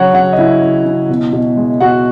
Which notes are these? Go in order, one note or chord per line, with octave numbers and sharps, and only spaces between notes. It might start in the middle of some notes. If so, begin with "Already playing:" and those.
Already playing: C#3 F#3 F#4 C#5 F#5
C#3 F#4 F#5
D#5
C#3 E4 E5
C#3
C#3
B2
B2
G#3
B2 F#4 F#5